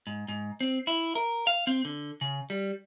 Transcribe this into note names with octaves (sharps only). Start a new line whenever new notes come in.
G#2
G#2
C4
E4
A#4
F5
C4
D3
C#3
G3